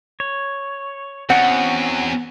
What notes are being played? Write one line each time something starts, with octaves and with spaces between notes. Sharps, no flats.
C#5
E2 C4 C#4 F#4 F#5